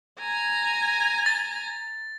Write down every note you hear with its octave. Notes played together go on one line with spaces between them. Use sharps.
G#5 A#5
A6